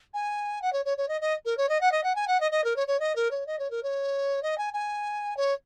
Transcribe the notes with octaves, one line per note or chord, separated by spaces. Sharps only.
G#5
F#5
C#5
C#5
C#5
D#5
D#5
A#4
C#5
D#5
F#5
D#5
F#5
G#5
F#5
D#5
D#5
A#4
C#5
C#5
D#5
A#4
C#5
D#5
C#5
A#4
C#5
D#5
G#5
G#5
C#5